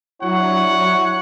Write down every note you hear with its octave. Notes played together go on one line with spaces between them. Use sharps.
F#3 D4 E4 C#5 F#5